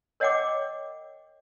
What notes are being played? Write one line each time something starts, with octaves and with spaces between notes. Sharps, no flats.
A#4 C#5 D#5 F#5 G5 D6